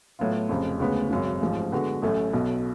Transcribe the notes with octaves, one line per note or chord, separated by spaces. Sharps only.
A2 F#3 B3 F4
F1 F2 C#3
D2 C#3 G#3 B3
G#1 F#2 C#3
A1 G#2 F3
D3 G#3 B3 F#4 B4
A1 A2 F#3 A3 C#4
B1 B2 F#3 A3